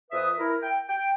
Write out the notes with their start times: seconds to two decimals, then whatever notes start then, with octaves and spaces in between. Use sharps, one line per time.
0.11 F2 B4 E5 D#6
0.39 E4 A#4
0.62 G5
0.88 G5